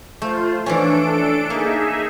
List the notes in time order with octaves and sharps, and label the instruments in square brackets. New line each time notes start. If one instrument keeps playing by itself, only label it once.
[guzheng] A3 [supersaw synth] F4 C5
[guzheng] E3 F3 C#4 [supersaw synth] D4 A4 D7
[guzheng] A#3 [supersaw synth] D#4 G#4 E5